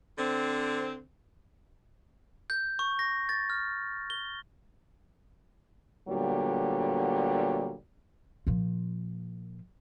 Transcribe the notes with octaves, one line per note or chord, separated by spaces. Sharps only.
D3 C4
G6
C#6
A#6
A6
F6
G7
A#2 D3 F#3 G3 B3
A#2 F3